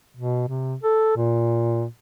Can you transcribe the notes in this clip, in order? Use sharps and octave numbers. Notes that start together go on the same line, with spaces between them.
B2
C3
A4
A#2